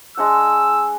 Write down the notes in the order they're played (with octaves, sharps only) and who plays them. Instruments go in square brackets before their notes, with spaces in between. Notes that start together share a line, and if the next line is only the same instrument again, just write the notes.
[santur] G#3 D4 F#5 [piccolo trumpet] E6